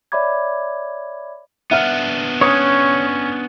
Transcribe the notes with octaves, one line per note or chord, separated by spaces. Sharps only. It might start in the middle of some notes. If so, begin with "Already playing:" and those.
C#5 D5 E5 B5 D6 G#6
B3 D4 E5 F#5 F6
C#4 C#5 D#6